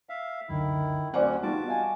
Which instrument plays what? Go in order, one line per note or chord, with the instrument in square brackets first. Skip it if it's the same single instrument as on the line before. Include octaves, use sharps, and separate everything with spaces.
[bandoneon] E5 F5
[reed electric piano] C#2 F#2 D3 [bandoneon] D#3 E4
[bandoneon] D2 F#3 C#4 [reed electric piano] C4 D6 [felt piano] C5 D5 F#5
[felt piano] G3 F4 [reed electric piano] B3 D#4 [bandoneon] F#4 A5 D6
[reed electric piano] D#5 F5 G#5